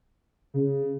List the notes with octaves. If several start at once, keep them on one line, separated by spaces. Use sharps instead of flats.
C#3